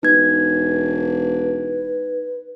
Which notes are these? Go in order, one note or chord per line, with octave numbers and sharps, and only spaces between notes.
E1 D#4 B4 G#6